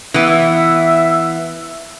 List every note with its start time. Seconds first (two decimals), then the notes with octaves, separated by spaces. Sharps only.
0.14 E3 B3 E5